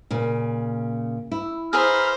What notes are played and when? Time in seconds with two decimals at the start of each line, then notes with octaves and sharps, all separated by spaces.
0.10 A#2 C#3
1.32 E4
1.73 G#4 B4 C5 E5 A#5 B5 F6